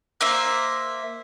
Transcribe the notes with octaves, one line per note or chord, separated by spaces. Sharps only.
A#3 C5 E5